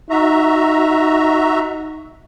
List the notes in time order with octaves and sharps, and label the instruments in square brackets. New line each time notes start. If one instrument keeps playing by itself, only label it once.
[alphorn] D#4 [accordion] F#4 E5 A#5